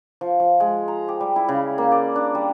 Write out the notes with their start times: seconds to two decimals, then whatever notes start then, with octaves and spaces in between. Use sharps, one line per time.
0.21 F3
0.40 F3
0.60 G#3
0.88 A#5
1.08 G4
1.21 G3
1.36 E4
1.49 C#3
1.78 A#3
1.92 D5
2.16 D4
2.35 G3